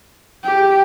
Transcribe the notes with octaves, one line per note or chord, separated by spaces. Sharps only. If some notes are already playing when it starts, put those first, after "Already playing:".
G4